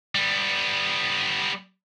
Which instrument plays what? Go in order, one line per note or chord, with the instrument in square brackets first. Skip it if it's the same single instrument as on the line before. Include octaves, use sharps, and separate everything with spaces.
[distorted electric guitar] G3 B3